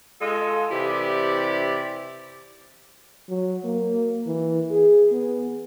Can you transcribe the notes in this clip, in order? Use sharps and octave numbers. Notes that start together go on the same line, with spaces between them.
G#3 F4 A4
C3 E3 E4 G4 D5
F#3
A#3
E3
G#4
B3